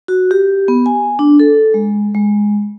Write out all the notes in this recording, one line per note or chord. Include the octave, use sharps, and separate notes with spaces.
F#4
G4
B3
G#5
D4
A4
G#3
G#3